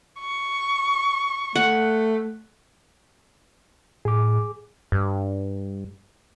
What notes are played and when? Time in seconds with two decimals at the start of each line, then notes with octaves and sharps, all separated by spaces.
0.21 C#6
1.55 A3 F#5
4.05 A2 G#4 D6
4.92 G2